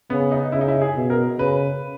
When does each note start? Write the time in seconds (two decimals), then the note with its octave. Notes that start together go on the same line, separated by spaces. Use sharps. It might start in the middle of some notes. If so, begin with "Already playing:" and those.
0.10 C#3 B3
0.32 D#4
0.52 C#3 E4
0.61 D#4
0.68 E4
0.81 G#4
0.95 B2
1.10 A#4
1.38 C#3 B4